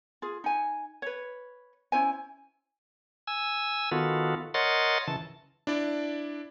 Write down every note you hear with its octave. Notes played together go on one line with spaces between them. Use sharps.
F4 G#4
D#4 G#5
B4 C#5
C#4 E4 C5 G#5
G#5 E6
D#3 B3 F4 F#4 A4
A#4 C#5 D#5 F#5 C6 A6
C#3 E3 A5
D4 E4 D5